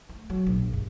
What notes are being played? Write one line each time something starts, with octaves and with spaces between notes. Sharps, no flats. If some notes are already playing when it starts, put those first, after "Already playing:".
A3
F#3
A#1
G2